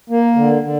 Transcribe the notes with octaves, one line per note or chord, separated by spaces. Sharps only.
A#3
D3
D3